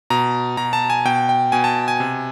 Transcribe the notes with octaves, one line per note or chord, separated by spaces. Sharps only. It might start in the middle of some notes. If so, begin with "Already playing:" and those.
B2 A#5
B2 A#5
A5
G#5
B2 G5
G5
B2 G#5
A5
G#5
C3